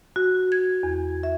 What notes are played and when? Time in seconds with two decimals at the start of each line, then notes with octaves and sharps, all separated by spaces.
0.16 F#4
0.52 G#6
0.83 E2
1.23 E5